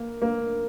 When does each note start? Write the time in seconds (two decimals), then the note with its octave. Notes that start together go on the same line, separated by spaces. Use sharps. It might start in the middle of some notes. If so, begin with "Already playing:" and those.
Already playing: A#3
0.22 A#3